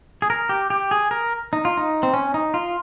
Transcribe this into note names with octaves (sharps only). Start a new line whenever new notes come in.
G#4
A#4
G4
G4
G#4
A#4
D#4
F4
D#4
C4
C#4
D#4
F4